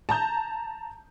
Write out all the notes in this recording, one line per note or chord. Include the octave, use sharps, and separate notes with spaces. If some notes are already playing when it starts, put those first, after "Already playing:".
A5 A#5 G6